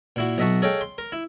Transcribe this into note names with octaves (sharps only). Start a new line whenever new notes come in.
A#2 E4 F#4
B1 D#5 E5 F#5 A5 C#6
G#4 A4 C#5 D#5 F5 G5
C6
A#4
E4